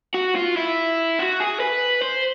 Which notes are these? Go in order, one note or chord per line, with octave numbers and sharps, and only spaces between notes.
F#4
F4
E4
F#4
G#4
B4
C5